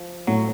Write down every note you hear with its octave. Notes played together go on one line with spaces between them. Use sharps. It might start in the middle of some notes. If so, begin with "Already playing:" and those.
Already playing: F3
A2 F#3